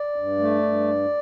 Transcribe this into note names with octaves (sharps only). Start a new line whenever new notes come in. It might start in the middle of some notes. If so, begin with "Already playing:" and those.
Already playing: D5
G2
A3
G2